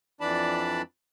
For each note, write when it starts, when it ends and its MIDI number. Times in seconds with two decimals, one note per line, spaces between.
0.21 0.82 41
0.21 0.82 52
0.21 0.82 62
0.21 0.82 74
0.21 0.82 81
0.21 0.82 83